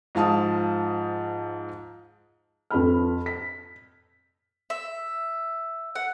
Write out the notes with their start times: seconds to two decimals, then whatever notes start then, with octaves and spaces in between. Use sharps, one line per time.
0.15 G#2 F3 F5 A5 D#6
2.71 F2 A4 B4 B5 F6
3.26 B6
4.70 E5
5.95 F#5